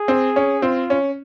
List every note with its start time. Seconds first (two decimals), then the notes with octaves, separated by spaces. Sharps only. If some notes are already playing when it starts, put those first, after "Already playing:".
Already playing: G#4
0.08 C4
0.36 C#4
0.62 C4 F4
0.90 C#4